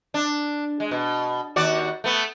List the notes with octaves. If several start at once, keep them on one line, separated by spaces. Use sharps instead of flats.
D4
G#3
B2
D#2 F#4 D5
A3 B3